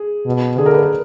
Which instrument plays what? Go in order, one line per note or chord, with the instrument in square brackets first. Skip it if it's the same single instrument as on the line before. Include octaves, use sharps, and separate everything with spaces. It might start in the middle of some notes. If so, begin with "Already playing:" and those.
Already playing: [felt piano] G#4
[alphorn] B2
[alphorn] D3 [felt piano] G#4
[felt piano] A#4
B4
A#4